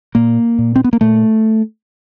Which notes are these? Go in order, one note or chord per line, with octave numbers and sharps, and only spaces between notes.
A#2 A#3
A#2
C4
B3
A#3
A#2 A3